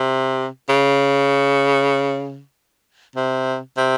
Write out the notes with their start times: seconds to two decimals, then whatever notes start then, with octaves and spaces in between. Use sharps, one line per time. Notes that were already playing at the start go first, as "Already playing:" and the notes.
Already playing: C3
0.69 C#3
3.16 C3
3.77 C3